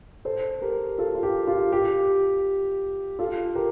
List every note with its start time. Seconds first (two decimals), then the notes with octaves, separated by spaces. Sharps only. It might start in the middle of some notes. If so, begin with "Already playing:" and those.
0.25 A4 C5
0.62 G4 A#4
0.98 F4 A4
1.15 F4
1.23 G4
1.47 F4
1.72 G4
3.19 F4 A4
3.55 G4 A#4